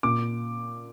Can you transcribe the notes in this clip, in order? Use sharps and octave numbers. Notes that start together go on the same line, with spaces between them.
A#2 D6